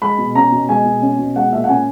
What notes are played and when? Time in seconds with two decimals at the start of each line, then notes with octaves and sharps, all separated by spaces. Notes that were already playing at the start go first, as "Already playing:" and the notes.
0.02 G#3 B5
0.18 B2
0.35 C#4 A#5
0.52 B2
0.69 G#3 G#5
0.85 B2
1.02 C#4
1.19 B2
1.36 G#3 F#5
1.52 A#2 E5
1.64 F#5
1.69 C#4 G#5